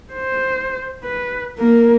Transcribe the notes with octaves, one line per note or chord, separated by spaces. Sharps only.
C5
B4
A#3 A#4